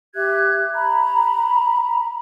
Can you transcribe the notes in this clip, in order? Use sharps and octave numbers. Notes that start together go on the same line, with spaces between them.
G4 E5 F#6 G#6
A#5 B5